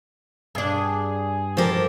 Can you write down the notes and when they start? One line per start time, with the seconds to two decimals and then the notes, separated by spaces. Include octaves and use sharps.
0.55 G2 D4 G#4
1.57 F3 G4 A4 A#4